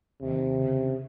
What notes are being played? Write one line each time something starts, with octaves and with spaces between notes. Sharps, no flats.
D#2 C3 D#3
C#3